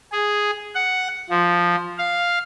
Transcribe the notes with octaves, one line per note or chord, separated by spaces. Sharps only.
G#4
F#5
F3
F5